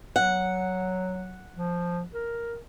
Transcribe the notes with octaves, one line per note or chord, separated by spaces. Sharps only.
F#3 F#5
F3
A#4